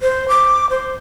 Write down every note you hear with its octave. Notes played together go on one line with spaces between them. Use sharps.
C5
D6
C5